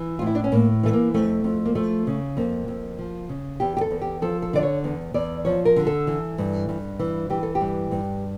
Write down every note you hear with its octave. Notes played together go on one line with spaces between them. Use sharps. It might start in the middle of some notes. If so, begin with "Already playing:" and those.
Already playing: E3
A2 F4
E4
D4
C#4
A2 A#3
E3 A3
A#3
F2 A3
F2
A#3
F3 A3
C#3
F2 A#3
F2
F3
C#3
E2 G4
G4
A4
E2
G4
F3 A4
A4
D3 D5
C#5
E2
E2 D5
F3 C#5
A#4
D3
A4
E3
G2
G2
E3
E3 G4
A4
G4
G2
G2